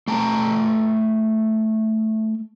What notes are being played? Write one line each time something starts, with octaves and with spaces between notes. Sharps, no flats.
A3 G5 A5 A#5